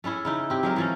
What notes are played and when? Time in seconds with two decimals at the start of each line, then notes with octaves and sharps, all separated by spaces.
0.04 A3 C#4 E4 G#4
0.25 C#3 D#4 E4
0.50 C4 G4
0.63 F#3 G#3 A#4
0.76 E3 F3 C#4